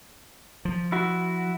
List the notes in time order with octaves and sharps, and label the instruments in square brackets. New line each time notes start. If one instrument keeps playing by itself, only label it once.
[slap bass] F3
[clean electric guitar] E4 F#4